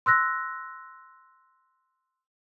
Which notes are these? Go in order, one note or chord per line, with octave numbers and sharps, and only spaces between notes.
C6 E6 F#6 A#6